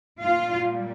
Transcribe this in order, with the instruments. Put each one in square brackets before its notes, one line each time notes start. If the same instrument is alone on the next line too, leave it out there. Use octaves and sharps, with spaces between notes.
[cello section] A#2 G3 F4 F5